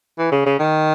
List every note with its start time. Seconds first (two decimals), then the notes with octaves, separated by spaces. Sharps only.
0.18 E3
0.32 C#3
0.46 C#3
0.59 D#3